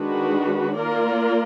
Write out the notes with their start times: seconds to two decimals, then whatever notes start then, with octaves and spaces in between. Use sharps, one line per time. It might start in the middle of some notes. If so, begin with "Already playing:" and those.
Already playing: D#3 G#3 D4 F#4 B4
0.77 A#3 F4 A#4 D5